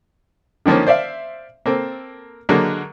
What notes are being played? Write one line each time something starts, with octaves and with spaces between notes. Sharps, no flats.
D3 D#3 F3 A#3 C#4
C5 D5 E5 F5
A#3 C4 A4
D3 F#3 G#3 A#3